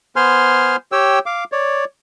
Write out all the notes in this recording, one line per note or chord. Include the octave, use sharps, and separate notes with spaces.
B3 C5 G#5 C6 F6
G4 C#5 G5 E6
F5 D6
C#5 D5